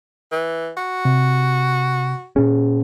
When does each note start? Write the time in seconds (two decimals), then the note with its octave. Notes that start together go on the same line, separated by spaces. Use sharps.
0.32 E3
0.77 F#4
1.05 C3
2.36 A#2 C#4 G#4